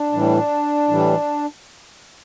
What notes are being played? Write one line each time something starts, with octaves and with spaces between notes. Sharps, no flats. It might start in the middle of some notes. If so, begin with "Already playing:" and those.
Already playing: D4
A2 E3 G3
A2 E3 G3